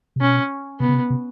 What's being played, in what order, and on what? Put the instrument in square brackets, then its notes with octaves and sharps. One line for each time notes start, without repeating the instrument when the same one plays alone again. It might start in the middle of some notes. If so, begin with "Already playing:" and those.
[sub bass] C3
[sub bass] B2 [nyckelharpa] C#4
[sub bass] C3 [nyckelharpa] B3
[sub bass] C#3
C3
C3